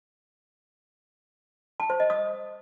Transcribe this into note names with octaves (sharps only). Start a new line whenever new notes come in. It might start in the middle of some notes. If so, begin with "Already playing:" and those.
A5
C5
D#5
D#6